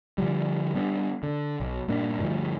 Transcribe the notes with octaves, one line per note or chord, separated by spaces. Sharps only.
D3 D#3 F3 G3
G3 B3 D4
D3
B1
G2 A#2 A#3 D4
D2 G2 D3 F3